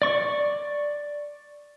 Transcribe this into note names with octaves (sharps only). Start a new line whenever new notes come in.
D5 C#6